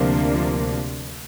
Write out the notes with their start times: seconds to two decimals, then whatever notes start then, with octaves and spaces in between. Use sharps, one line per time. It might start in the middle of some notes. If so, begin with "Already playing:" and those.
Already playing: D2 C3 F3 A#3 D4